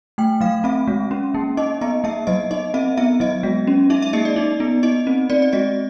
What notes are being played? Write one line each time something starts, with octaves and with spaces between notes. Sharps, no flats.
A3 G5
F#3 F5
C4 E5
G#3
C#4
A#3
D#4 D#5
B3 D#5
A#3 E5
F#3 D#5
D#4 D#5
C4 E5
B3 E5
F#3 D#5
G#3
C#4
D#4 E5
E5
A#3 D#5
D5
D#4
B3
D#4 D#5
C4
C4 D5
D5
G#3 D#5